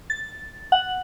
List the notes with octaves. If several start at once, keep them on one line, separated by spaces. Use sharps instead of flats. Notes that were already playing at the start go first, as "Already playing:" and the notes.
A6
F#5